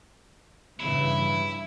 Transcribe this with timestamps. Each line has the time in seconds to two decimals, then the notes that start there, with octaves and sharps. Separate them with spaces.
0.80 G2 C#3 E3 E4